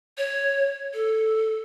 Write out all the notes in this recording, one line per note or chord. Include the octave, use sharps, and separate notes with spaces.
C#5
A4